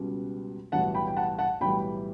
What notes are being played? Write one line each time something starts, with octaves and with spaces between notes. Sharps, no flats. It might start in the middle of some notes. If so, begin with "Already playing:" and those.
Already playing: C#2 B2 G3
B1 A2 E3 G3 F#5 A5
G5 B5
G5
F#5 A5
F#5 A5
B1 A2 E3 G3 G5 B5